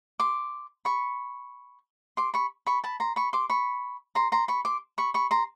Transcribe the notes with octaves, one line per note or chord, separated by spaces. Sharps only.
C6 D6
B5 C#6
C6 D6
B5 C#6
B5 C#6
A5 B5
A#5 C6
B5 C#6
C6 D6
B5 C#6
A#5 C6
A#5 C6
B5 C#6
C6 D6
B5 C#6
B5 C#6
A#5 C6